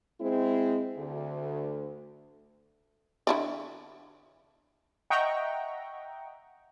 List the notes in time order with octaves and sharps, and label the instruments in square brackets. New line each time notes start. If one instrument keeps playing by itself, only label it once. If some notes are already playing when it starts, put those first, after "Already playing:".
[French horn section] G#3 C4 E4
D2
[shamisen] D3 E4 D5
[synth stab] D#5 E5 F#5 G5 A#5 C#6